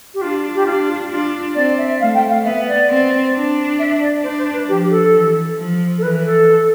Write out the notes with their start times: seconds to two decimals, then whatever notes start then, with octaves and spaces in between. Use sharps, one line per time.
0.14 G4
0.21 D4 F4
0.54 G4
0.66 D4 F4
0.88 F4
1.10 D4 F4
1.54 C4 D5
1.78 E5
1.99 A3 F5
2.14 G5
2.29 F5
2.44 B3 E5
2.67 D5
2.88 C4
3.34 D4
3.79 E5
4.00 D5
4.23 D4 C5
4.38 C5
4.53 B4
4.67 F3 G4
4.90 A4
5.13 E3
5.57 F3
5.98 A4
6.02 E3 B4
6.24 A4